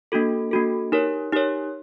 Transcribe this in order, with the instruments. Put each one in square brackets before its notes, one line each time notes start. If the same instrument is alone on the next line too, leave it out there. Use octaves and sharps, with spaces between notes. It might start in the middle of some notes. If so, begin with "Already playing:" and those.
[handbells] A#3 D4 F#4 A4
A#3 D4 F#4 A4
D#4 G4 A#4 C#5
D#4 G4 A#4 C#5